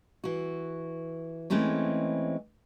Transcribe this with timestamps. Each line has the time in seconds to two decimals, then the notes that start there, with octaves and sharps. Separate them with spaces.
0.24 E3 F#4
1.50 E3 G#3 A3 C4 C#4